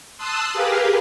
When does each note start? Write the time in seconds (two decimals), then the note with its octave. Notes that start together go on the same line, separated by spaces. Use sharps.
0.17 A5 C6 D#6 E6 F#6
0.53 G4 G#4 A#4 B4 F5